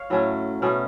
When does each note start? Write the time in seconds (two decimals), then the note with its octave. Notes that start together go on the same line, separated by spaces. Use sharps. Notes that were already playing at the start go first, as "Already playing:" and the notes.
Already playing: C#5 F5
0.10 A2 F#3 A3 C#4
0.62 B2 A3 C#4